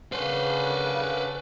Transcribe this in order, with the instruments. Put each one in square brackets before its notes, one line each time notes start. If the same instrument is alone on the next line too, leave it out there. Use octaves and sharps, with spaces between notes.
[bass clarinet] C#3 [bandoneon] C#4 D4 F#5 [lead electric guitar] B4 C5